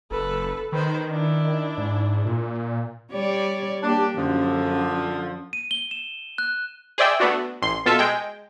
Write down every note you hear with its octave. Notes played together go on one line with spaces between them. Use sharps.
F#1 A4 B4
D#3 B4 C5
D4 E4
G#2
A#2
G3 C#5 D5
A#3 D4 G4
F#2 D3 F3
D#7
G7
E7
F#6
G#4 C5 D5 E5 G5
A3 B3 D4 F#4
A1 C6
B2 F4 A4 E5 A5
G#3 G5